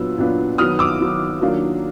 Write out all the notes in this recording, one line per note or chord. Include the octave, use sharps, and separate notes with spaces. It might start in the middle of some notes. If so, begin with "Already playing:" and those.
Already playing: A#2 F#3 B3 D4 F4 E6
A#2 F#3 B3 D4 F4
D#3 F#3 B3 D#6 F6
D6 E6
D#3 F#3 B3
D#3 F#3 A#3 D4 F4